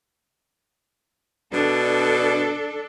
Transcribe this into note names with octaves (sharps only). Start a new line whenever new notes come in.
B2 D4 A4